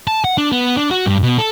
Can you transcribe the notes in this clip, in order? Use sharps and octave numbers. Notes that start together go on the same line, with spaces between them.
A5
F#5
D4
B3
D4
F#4
G2
B2
A4